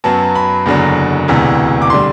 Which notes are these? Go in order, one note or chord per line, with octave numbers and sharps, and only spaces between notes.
F#2 F#3 B3 A5
B5
F#1 E2 D3 F#3
E1 D2 C3 E3
D6
D3 G3 C6